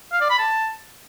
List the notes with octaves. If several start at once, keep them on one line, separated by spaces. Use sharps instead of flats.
F5
D5
B5
A5